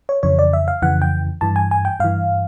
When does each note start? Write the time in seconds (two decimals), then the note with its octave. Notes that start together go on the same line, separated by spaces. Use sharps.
0.09 C#5
0.23 F2 C#3 E3 C#5
0.39 D5
0.53 E5
0.68 F5
0.82 F2 C#3 E3 F#5
1.02 G5
1.41 G2 E3 A5
1.56 G#5
1.71 G#5
1.85 G5
2.00 G2 E3 F5